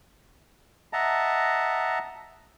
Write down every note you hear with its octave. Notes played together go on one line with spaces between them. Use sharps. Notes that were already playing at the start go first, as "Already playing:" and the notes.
D#5 E5 F#5 A5 A#5